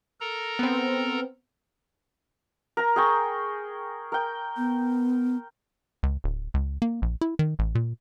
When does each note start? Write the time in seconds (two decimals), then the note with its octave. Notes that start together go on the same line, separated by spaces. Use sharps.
0.20 A4 A#4 A#5
0.59 B3 C4
2.77 A#4 A#5
2.96 G#4 G5 C#6
4.12 A#4 G5
4.57 B3
6.03 C#2
6.24 D1
6.54 C#2
6.82 A#3
7.02 A#1
7.21 E4
7.39 D#3
7.59 A1
7.75 A#2